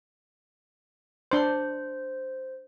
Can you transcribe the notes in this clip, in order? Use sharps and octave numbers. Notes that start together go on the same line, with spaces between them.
D4 C5 C6